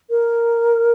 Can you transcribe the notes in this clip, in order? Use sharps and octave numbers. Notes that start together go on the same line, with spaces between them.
A#4